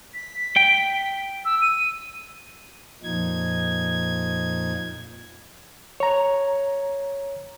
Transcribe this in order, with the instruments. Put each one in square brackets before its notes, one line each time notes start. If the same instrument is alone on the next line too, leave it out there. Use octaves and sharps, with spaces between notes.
[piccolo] B6
[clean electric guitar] G5
[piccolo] E6
D#7
[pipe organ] F2 A#2 F3 D#4 G#6
[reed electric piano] C#5 A#5